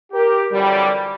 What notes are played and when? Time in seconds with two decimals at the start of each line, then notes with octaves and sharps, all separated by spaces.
0.13 G4 A#4
0.52 F2 D3 E3 F#3 G3